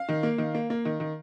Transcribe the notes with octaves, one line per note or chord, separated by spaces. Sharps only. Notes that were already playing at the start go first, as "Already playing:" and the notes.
Already playing: F5
D#3
A#3
D#3
A#3
A#3
D#3
D#3